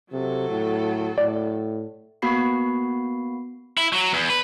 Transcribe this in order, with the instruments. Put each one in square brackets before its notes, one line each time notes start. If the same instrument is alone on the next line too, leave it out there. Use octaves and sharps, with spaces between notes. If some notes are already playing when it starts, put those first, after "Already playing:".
[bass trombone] C3 [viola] F#3 A4
[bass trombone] A2
[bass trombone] A2 [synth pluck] D5
[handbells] A#3 B3 F#4 B5 C7
[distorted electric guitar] E4
F#3
E2
B4